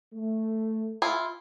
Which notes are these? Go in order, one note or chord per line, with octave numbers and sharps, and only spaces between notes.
A3
E4 F4